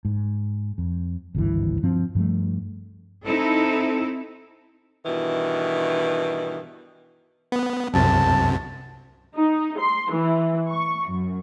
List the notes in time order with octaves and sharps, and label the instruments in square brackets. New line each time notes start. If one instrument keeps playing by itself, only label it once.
[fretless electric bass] G#2
F2
G#1 D2 G2 E3
G2 F3 C4
G2 F3 G3 A3
[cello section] C4 D#4 E4 A4
[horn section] G2 B2 D#3 E3
[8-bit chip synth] B3
[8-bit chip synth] C2 F#2 C3 [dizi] A5
[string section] D#4
C6
E3
C#6
F#2